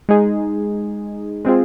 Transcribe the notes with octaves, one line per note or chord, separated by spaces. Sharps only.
G#3 D#4 G#4
G#3 C4 F4 G#4